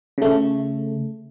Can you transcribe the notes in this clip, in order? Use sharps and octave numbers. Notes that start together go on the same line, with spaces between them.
C#3 A3